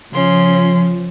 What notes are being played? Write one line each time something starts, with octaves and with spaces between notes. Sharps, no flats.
C#3 F3 C#4 C6